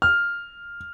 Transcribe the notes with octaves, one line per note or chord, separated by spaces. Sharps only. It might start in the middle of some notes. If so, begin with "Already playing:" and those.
F6